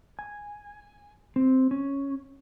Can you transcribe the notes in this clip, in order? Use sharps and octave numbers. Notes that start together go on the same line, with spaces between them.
G#5
C4
C#4